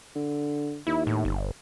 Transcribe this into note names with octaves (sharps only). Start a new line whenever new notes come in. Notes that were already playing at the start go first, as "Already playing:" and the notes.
D3
D#2 E4
A2
G1